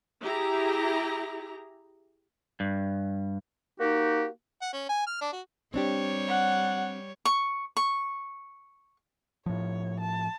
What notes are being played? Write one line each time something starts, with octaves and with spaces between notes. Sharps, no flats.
E4 G4 G#4 A#5
G2
A#3 D#4 F#4 G4
F#5
C#4
G#5
F6
D4
F#4
G3 C4 D4 G4 C#5
F#5
C#6
C#6
A2 F3 C#5
A5